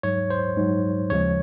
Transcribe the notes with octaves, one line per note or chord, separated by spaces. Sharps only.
G#2 F#3 C#5
C5
G#2 F#3
D#2 C#3 F3 G#3 C#5